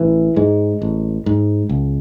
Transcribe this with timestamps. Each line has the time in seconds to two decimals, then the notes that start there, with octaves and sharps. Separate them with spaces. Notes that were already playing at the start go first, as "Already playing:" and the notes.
Already playing: A1 E3
0.36 G#2 G#3
0.82 A1
1.26 G#2
1.69 C#2